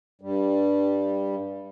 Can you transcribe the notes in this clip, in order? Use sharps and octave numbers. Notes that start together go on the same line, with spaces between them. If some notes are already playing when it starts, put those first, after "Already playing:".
G2 G3